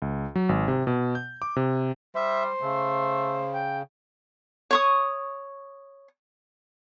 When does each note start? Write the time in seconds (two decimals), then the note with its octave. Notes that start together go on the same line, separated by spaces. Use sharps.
0.02 C#2
0.36 F#3
0.49 G#1
0.68 C3
0.87 B2
1.15 G6
1.42 D6
1.56 C3
2.15 G3 C5 E5
2.62 C#3 A3
3.54 G5
4.71 C#5 C#6 D#6